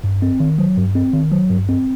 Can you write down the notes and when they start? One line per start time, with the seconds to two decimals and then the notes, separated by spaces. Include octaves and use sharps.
0.04 G2
0.22 C4
0.40 D#3
0.58 F#3
0.77 G2
0.95 C4
1.13 D#3
1.32 F#3
1.50 G2
1.69 C4